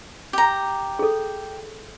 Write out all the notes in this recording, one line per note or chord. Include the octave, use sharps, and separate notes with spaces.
G4 A#5
G#4 A4